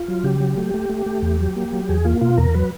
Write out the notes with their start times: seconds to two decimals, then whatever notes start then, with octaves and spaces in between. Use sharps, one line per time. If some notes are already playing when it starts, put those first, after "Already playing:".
Already playing: F4
0.08 F#3
0.24 C#3 G4
0.40 F#3
0.57 A3
0.74 A3
0.89 A3
1.06 A3
1.22 E2
1.39 F#3
1.56 A#3
1.72 F#3
1.89 E2 G#4
2.05 A#3 F4
2.21 B2 F4
2.38 E2 A#4
2.54 F#3 B4